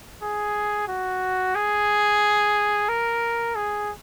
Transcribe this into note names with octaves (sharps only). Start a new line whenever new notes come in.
G#4
F#4
G#4
A#4
G#4